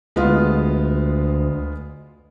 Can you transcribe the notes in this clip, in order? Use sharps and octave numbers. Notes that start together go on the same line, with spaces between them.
D2 G#3 B3 F4